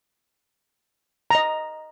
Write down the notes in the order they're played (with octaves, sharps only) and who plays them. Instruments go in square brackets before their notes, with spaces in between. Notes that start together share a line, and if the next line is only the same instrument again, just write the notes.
[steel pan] D#5 A#5